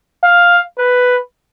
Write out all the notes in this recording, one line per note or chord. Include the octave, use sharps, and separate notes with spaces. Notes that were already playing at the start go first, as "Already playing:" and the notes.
F5
B4